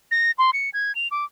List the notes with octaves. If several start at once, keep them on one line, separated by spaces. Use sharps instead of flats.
A#6
C6
C#7
G#6
F7
D6